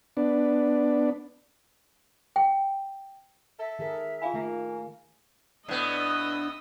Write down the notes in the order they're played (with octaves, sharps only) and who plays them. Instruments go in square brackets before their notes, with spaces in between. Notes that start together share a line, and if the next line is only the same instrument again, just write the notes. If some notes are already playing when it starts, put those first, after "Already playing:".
[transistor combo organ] B3 D4
[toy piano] G5
[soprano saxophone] A4 [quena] E5
[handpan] D#3 G#4 A#4
[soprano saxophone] E4 [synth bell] F4 F5 G#5
[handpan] D#3 A3 [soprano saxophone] A#3
[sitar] A2 B3 [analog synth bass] D4 [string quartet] D#5 D#6 E6